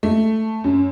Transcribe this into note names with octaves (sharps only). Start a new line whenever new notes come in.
A3
F#2